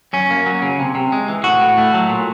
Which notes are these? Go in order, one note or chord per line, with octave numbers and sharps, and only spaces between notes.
F#2 C#4
A#3
F#3
C#3
C3
C3
G#3
E3
A2 F#4
A2
A3
F#3
A#2